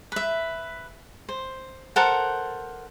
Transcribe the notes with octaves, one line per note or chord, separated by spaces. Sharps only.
B4 E5
C5
A4 A#4 C5 F#5